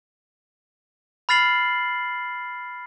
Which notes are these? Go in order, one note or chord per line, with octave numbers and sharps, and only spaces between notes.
B5 F6 A6 C7 F#7